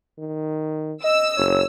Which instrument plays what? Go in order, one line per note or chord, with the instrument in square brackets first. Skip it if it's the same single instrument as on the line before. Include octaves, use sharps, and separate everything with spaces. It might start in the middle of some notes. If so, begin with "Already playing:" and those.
[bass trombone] D#3
[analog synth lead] D#5 [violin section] E6
[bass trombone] F#1 [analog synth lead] C#5